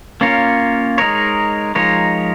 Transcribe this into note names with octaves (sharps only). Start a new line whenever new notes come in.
A#3 C#4 F4 A#4 C#5
G#3 D#4 A#4 C#5
F3 G#3 D#4 A#4 C#5